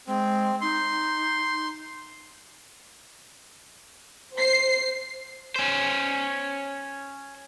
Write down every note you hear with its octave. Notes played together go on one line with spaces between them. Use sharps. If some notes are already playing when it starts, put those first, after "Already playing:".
G#3 C4
D#4 C6
C5 C7
C#4 C5